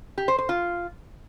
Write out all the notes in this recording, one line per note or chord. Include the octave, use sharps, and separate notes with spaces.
G4
C5
C5
F4